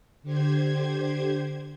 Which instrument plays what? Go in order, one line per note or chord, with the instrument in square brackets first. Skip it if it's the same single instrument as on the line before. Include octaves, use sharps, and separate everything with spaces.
[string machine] D3 G4 C5 G#6